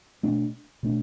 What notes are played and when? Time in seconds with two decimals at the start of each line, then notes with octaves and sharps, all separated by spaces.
0.23 B2 A3 D4
0.83 B2 A3 D4